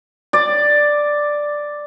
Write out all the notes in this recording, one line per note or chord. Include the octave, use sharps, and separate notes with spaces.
D5